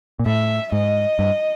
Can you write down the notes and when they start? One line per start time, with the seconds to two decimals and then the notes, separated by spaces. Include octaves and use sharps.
0.19 A#2
0.26 A2 E5
0.72 G#2 D#5
1.19 G2